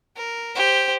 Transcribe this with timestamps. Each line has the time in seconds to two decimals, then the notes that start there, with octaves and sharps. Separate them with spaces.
0.17 A#4
0.56 G4 C5